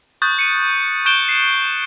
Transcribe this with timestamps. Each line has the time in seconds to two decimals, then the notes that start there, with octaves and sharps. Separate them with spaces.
0.22 C#6 D#6 F#6 G6 A6
0.39 C#7 D#7
1.06 C#6 F#6 G6 D7 E7 G7
1.29 C7